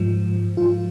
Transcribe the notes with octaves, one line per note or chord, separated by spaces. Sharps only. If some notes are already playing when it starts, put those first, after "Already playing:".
Already playing: G#2 F3
G#2 F3 F4